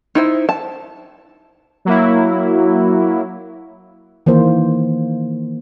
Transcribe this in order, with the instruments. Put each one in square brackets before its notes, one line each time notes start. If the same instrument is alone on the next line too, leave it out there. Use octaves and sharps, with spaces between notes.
[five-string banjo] D#4 E4 C5
A5
[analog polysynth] F#3 A#3 E4
[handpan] D#3 E3 A#3 C5